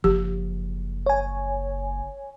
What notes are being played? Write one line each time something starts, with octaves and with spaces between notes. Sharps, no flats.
F#1 F3 G4
C#5 G#5